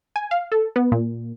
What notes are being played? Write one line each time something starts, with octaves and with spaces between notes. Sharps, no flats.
G#5
F5
A4
B3
A#2